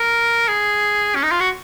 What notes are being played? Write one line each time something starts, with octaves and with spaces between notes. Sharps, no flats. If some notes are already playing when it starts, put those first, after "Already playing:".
Already playing: A#4
G#4
C#4
D#4
F4
F#4